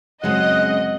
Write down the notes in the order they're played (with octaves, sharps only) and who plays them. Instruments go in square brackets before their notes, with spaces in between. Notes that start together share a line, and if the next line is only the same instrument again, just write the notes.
[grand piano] F#2 C4 [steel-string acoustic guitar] C#3 G#3 [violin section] D#5 [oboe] F#5